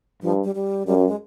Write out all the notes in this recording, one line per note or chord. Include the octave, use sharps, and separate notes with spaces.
G2 F3
G3
G3
F#2 G3
F#3
G#3